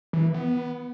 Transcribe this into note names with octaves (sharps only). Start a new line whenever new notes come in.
E3
B3